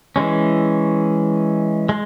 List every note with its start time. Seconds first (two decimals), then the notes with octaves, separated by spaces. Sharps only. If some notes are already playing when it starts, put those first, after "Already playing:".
0.16 E3 G#3 C#4
1.89 G#3